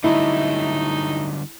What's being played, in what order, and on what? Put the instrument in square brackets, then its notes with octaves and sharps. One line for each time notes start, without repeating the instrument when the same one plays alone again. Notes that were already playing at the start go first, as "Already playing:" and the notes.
[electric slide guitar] D3 F#3 G3 [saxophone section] A3 D#4 [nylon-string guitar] E4